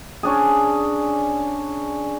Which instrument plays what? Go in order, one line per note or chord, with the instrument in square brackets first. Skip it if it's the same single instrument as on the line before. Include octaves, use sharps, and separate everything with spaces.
[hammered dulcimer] C#4 D4 G#4